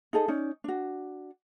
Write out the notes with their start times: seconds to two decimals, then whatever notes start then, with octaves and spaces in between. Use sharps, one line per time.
0.13 D#4 G#4 A4 D#5
0.28 C#4 D#4 D5
0.64 D4 F#4